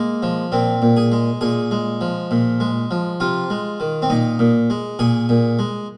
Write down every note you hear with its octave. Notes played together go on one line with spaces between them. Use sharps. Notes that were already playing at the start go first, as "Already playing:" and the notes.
Already playing: G#3 A#3
F3
A#2 C4
A#2
G#4
G#3
A#2 G#4
G#3
F3
A#2
G#3
F3
C3 F4
G#3
D#3
C4
A#2 D#4
A#2
G#3
A#2 G#4
A#2
G#3